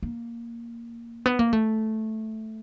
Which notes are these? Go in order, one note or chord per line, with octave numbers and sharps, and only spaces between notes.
A#3
B3
A#3
A3